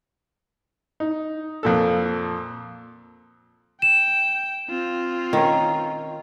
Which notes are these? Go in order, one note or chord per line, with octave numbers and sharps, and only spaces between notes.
D#4
F2 A#2 A4
G5 E7
C4 F4
D#3 C#4